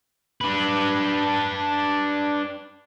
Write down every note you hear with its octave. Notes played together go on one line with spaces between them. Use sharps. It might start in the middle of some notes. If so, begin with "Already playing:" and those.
D4 B4